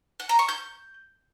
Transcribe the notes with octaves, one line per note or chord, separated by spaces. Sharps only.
F#5
A#5
C#6
G6